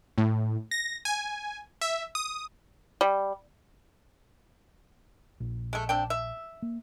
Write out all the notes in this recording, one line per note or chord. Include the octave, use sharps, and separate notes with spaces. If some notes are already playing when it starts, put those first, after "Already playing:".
A2
A#6
G#5
E5
D#6
G3
A#1
G#3 A3
C4 D4 G5
E5
A#3